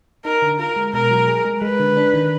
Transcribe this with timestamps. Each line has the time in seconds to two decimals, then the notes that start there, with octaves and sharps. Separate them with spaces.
0.25 D#4 A#4
0.42 D3
0.59 F4 A#4
0.76 G#3
0.94 B2 A#4
1.11 F#3
1.28 G#4
1.45 G#3
1.62 G#3 B4
1.80 D3
1.97 D4
2.14 D#3